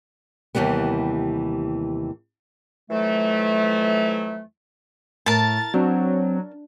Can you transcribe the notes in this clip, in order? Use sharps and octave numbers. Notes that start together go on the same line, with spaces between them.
D#2 C3 E3 G3 B3
F2 E3 F#3 A3
A2 A#4 A5 A6
F#3 C4 D4